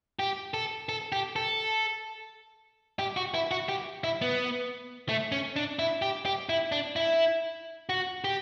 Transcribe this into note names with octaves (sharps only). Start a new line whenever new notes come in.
G4
A4
A4
G4
A4
G4
F#4
E4
F#4
G4
E4
B3
A3
C#4
D4
E4
G4
G4
E4
D4
E4
F#4
G4